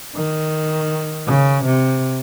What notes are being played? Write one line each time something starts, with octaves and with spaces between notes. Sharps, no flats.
D#3
C#3
C3